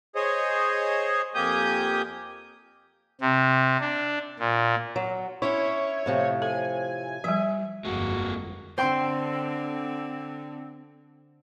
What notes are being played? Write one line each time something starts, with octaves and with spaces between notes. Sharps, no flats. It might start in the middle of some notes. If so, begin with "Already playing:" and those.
G#4 C5 C#5 D#5
F2 A#3 G4 G#5 D#6 G6
C3
D4
A#2
F#3
C#4 D4 E4 C#5
A2 C3 F3
A4 G#5
F3 G3 E5
G1 F2 G#3 A#3 F#4
D3 C4 C5 G5 C6